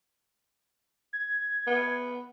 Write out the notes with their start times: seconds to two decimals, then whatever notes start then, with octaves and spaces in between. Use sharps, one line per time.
1.13 G#6
1.67 B3